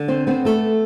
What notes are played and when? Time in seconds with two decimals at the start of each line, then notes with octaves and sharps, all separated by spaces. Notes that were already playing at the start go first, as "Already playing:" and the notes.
Already playing: D3
0.08 C4 C5
0.27 B3 C4 C5
0.45 A3 A4